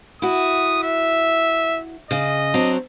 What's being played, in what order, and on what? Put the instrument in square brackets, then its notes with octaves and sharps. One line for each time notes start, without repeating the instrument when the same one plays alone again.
[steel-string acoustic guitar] E4 F#4 [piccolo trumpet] D#6
[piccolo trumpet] E5
[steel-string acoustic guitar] C#3 [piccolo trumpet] D#5
[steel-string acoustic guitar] F#3 C4 D4